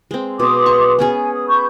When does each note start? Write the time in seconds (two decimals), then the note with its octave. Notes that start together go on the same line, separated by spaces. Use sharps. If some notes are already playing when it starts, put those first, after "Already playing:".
0.11 G#3 C4
0.40 B2 C6 D6 D#6
0.66 C#6
0.99 B3 C#4 G#4 G#5
1.33 D#6
1.48 B5 C#6 G6